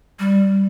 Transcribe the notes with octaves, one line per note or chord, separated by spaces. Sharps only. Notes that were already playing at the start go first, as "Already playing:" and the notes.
G3